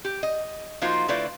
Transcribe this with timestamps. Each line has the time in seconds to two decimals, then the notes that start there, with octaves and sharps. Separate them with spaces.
0.05 G4
0.23 D#5
0.82 F3 A#3 D#4 F4 F#4 C5
1.08 D3 A3 E4 F4 B4 D5